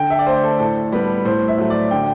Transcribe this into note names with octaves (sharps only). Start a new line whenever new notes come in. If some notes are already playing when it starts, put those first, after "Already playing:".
Already playing: D3 G5
E5
D5
A3 C5
A4
A2 A4
G3 B3
A2 C5
E5
F#3 A3
D5
D3 G5